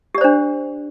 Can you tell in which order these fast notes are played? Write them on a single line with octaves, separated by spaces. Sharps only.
G4 D5 C5 D4